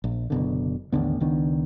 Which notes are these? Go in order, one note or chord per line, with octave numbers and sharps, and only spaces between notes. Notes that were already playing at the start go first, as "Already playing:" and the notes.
A#1
F#1 B2 D3
A1 D#2 D3 B3
C#2 D#3 B3 D4